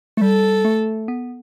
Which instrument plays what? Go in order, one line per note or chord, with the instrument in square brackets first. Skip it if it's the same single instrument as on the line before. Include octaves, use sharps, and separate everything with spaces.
[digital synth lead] A3
[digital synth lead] G3 [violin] A4
[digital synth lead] A3
B3